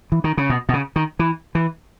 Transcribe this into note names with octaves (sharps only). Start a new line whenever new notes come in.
E3
D#3
C#3
B2
B2
C#3
D#3
E3
E3